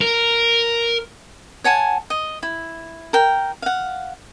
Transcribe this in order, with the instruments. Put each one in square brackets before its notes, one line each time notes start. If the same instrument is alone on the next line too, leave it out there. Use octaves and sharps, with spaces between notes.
[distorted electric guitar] A#4
[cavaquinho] C#5 F#5 G#5 A5
D#5
E4
A#4 G5
F5 F#5